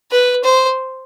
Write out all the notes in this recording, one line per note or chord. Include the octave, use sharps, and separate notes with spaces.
B4
C5